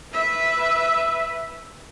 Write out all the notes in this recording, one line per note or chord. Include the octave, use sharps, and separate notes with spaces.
B4 E5